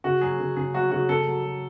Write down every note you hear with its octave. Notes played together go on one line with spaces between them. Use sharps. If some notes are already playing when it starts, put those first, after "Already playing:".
C#3 F#4
F#3 G#4
C#3
C#3 G#4
F#3 F#4
C#3 F#4
C#3 A4
F#3
F#3